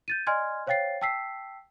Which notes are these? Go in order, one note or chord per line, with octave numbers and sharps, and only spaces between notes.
G6 A6 D#7
D5 D#5 G#5 C6 F6 G#6
C5 C#5 F5 G5 A6 C7
G5 A5 E6 B6 C7